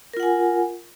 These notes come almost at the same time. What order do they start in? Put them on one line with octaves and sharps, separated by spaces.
A#4 F4 F#5 G#5